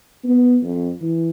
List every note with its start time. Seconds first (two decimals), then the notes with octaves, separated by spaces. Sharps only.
0.24 B3
0.63 F2
1.01 E3